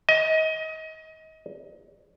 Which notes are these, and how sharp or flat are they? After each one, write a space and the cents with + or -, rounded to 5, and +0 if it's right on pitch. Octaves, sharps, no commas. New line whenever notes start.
D#5 +30